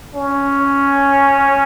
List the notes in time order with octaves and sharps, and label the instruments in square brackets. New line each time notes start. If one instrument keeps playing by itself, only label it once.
[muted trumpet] C#4